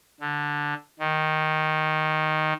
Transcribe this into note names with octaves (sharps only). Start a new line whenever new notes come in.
D3
D#3